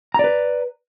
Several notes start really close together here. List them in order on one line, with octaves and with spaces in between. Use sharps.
A#5 D5 B4